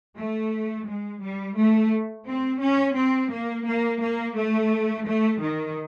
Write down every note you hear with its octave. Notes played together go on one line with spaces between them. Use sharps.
A3
G#3
G3
A3
C4
C#4
C4
A#3
A#3
A#3
A3
A3
D#3